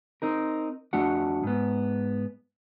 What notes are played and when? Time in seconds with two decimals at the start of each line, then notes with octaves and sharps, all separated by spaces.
0.22 C4 D#4 A#4
0.93 F2 A3 D4 F#4 F#5
1.43 G#2 B3